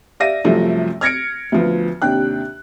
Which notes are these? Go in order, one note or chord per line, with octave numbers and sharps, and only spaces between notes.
G4 D5 E5 F5 A#6 D#7
C2 F#2 C3 F3 A3 E5
F6 G#6 A#6 C#7 D7
D2 F3 B3
D#2 C3 D4 G5 F#6